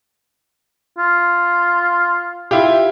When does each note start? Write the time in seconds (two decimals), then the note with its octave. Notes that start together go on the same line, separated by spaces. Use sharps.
0.98 F4
2.51 E4 F4 G4